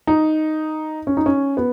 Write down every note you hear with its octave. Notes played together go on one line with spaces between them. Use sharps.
D#4
C#4
D#4
C#4
B3